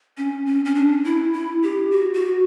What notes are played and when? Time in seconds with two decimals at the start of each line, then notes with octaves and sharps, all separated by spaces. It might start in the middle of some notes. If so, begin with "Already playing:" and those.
0.17 C#4
0.46 C#4
0.65 C#4
0.75 D4
1.04 E4
1.33 E4
1.63 G4
1.91 F#4
2.14 F#4